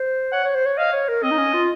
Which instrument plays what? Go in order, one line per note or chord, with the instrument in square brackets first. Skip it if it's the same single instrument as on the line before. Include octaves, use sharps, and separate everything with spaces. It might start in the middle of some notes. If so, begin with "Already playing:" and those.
Already playing: [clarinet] C5
[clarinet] C#5 [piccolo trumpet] F#5
[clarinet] C#5
C5
C#5
[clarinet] D#5 [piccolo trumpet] F5
[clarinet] C#5
A#4
[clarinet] C4 [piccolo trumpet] D#5
[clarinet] D#4
C#4
F4